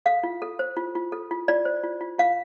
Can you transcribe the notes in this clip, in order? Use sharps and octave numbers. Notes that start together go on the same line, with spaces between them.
A4 F5
F4
A4
C5
F4
F4
A4
F4
F4 D5
C5
F4
F4
F4 F5